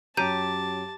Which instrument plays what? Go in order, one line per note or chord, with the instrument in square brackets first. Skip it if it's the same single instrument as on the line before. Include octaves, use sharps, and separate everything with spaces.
[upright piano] F#2 F#3 [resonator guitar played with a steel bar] G4 [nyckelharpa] A5 [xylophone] A#5 G6 D#7